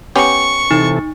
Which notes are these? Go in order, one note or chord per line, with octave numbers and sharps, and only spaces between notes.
B3 C#4 G4 C#6
C3 E3 D#4 A4